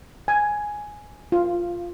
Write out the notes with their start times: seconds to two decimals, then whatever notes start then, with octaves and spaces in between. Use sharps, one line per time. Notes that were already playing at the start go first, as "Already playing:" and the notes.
0.28 G#5
1.32 F4